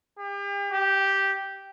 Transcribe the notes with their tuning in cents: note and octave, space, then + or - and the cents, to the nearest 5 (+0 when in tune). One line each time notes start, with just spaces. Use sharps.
G4 +40
G4 -5